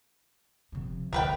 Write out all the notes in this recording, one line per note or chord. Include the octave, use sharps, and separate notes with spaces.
C3 F3
D2 G3 A#4 B4 G5